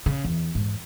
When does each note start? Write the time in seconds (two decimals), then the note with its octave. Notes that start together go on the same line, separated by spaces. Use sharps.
0.06 C#3
0.24 E2
0.55 G#2